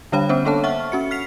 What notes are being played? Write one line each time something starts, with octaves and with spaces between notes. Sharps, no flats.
D3 G3 D4 C#5 F5 B5
B3 C#4 C5
A#3 D4 A4 C#5 A5
E5 F#5 C#6 F6
C#4 F#4 C#7
F6 B6 C7 F7